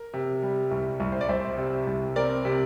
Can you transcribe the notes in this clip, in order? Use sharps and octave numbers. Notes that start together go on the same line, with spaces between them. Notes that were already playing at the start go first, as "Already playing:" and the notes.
Already playing: A#4
C3
G3
C2
C2
C5
D5
C2 C5 E5
C3
C2
C4 A#4 D5
C3